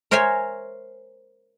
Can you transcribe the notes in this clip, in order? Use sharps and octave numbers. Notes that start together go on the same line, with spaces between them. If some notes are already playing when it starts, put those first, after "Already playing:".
A#4 C5 C#5 E5 G#5